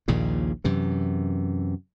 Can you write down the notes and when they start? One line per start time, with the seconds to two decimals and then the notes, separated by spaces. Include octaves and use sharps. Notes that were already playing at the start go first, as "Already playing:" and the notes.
0.08 A#1 D#2 A#2 C#3
0.64 F#2 C3 E3